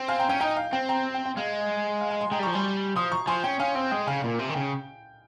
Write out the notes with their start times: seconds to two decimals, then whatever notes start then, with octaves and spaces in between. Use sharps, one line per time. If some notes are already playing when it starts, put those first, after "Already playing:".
Already playing: C4
0.08 F5 G#5
0.19 G5 A#5
0.29 C#4 G5
0.40 D#4 G5
0.56 F5
0.73 C4 G5
0.89 G5 A#5
1.15 G5
1.26 G5
1.37 G#3 F5
2.01 F5
2.11 F5 G#5
2.21 G#5 C6
2.31 G#3 G5 A#5
2.39 G3
2.43 F3 A#5 C#6
2.53 G3 G#5 C6
2.96 F3 C6 D#6
3.12 A#5 C#6
3.27 F3 G#5 C6
3.43 C#4 G5
3.60 C#4 F5 G#5
3.75 C4 G5
3.91 G#3 G5
4.07 C#3 F5 G#5
4.24 A#2
4.39 C3
4.49 D#3
4.55 C#3 G5